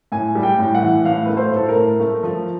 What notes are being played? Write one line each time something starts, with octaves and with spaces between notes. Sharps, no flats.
A2 G#5
G3
G5
A2
F#5
E3
A2 F5
A3 B4
C5
A2 A4
A#4
A2
A3
F3